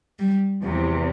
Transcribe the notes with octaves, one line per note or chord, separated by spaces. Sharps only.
G3
E2 C3 E3 F3